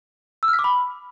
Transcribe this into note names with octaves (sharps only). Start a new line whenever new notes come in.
E6
F6
B6
D6
B5